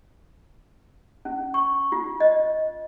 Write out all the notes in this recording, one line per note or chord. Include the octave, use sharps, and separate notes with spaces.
C#4
C#6
F4
D#5